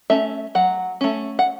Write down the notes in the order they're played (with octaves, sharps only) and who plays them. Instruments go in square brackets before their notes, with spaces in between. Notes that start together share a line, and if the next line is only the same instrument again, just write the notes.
[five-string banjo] A3 C#4 E5
F#3 F#5
A3 C#4
F#5